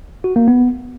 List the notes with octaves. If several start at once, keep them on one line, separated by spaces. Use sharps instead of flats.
F#4
A#3
B3